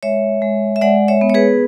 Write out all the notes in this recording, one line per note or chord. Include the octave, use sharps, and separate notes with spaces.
G#3 C#5 E5
G#3
E5
G#3 D5 F#5
C#5 E5
B3
C#5
G#4 B4